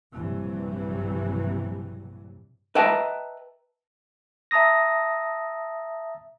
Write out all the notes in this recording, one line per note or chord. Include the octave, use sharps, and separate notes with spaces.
A#1 G2 C3 E3 F#3
B4 D#5 E5 G5 A5 A#5
E5 A5 A#5 D#6 A#6